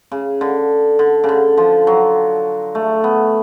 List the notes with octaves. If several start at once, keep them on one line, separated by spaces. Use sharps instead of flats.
C#3
D3
D3
C#3
D3
F3
F#3
A3
B3